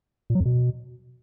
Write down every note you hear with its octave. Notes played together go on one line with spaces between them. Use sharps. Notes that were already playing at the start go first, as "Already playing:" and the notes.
A#2
F#3
F2
B2